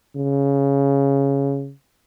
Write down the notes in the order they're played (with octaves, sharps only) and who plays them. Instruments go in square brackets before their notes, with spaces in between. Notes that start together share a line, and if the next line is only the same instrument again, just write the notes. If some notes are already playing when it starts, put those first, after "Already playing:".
[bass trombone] C#3